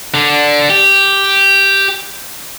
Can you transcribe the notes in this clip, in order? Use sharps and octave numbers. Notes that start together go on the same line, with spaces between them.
D3 D4
G4